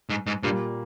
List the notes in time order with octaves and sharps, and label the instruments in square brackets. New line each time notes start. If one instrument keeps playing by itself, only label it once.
[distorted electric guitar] G#2
G#2
[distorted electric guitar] G2 [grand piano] A#2 G3 A#3